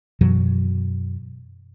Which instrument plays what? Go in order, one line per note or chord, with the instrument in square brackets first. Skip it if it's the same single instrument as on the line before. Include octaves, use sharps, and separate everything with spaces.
[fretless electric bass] F#2 B2 E3 F#3